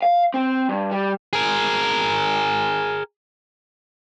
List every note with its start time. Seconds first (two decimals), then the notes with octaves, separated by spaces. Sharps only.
0.02 F5
0.34 C4
0.69 G2
0.91 G3
1.33 G#4 A#4